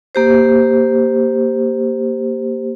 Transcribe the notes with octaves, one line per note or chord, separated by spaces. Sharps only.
A#3 G4 C5